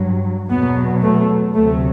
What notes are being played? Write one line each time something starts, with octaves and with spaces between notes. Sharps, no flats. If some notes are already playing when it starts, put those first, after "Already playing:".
Already playing: G2 F#3
E2 B2 F#3 B3
A3
D2 C3 F#3 A3